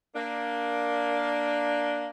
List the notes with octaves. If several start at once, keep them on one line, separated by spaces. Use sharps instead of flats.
A#3 D4